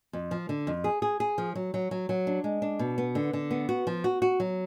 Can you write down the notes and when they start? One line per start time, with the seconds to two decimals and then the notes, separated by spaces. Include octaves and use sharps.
0.13 F2
0.31 F3
0.49 D3
0.67 F2
0.84 G#4
1.02 G#4
1.20 G#4
1.38 F3
1.55 F#3
1.74 F#3
1.91 F#3
2.09 F#3
2.27 D4
2.44 G#3
2.62 D4
2.79 B2
2.98 B3
3.15 D3
3.33 D3
3.51 B3
3.69 F#4
3.87 F3
4.04 F#4
4.22 F#4
4.40 F#3